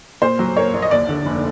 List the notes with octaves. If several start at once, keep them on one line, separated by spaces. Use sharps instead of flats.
A#2 C5
F#3
A#3 C#5
A#1
D#5
D#2 D5
D3
F1